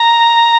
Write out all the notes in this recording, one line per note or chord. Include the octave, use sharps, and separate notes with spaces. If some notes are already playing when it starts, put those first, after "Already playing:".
Already playing: A#5